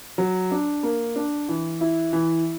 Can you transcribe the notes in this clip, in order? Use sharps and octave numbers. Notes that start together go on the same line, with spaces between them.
F#3
D4
A#3
D4
E3
E4
E3